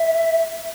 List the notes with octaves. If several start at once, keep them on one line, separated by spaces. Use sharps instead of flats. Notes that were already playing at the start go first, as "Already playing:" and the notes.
Already playing: E5